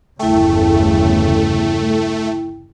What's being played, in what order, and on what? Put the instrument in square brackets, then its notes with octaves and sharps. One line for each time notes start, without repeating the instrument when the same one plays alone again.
[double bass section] G1 E2 C#3 [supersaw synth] A3 [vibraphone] E4 G5